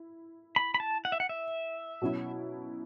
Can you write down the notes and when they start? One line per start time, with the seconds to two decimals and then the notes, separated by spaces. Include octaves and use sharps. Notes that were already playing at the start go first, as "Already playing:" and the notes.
Already playing: E4
0.56 B5
0.74 B5
0.80 A5
1.05 F#5
1.12 E5
1.20 F#5
1.29 E5
2.02 B2 F#3 C#4 E4